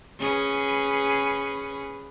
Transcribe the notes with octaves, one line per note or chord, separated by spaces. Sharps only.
C#4 G#4 B4